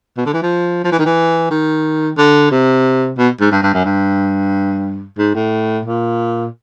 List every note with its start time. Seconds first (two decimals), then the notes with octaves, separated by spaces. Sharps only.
0.17 B2
0.26 D3
0.34 E3
0.42 F3
0.84 F3
0.92 E3
0.99 D#3
1.06 E3
1.51 D#3
2.17 D3
2.51 C3
3.18 B2
3.40 G#2
3.52 G2
3.63 G2
3.74 F#2
3.85 G2
5.18 G#2
5.35 A2
5.85 A#2